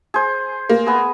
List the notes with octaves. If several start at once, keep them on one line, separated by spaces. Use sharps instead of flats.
G#4 C5
A#3
B3 G#4